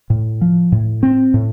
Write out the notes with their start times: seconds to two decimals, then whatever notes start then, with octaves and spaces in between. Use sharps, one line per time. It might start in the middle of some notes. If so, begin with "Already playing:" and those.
0.10 A2
0.41 F3
0.72 A2
1.03 C4
1.34 A2